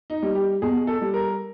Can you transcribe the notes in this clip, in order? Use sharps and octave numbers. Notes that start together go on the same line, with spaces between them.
D#4
G3
G4
B2 G#4
A4
G3
A#4